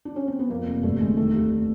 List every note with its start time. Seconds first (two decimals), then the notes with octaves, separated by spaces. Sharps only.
0.05 D4
0.16 C#4
0.28 C4
0.39 B3
0.49 F2 A#3
0.66 F1 A#3
0.83 G2 A3
1.01 G1 G#3
1.17 D#3 A3
1.34 D#2